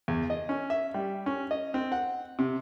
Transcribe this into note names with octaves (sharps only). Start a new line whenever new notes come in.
E2
D#5
C#4
E5
G3
C#4
D#5
C4
F#5
C3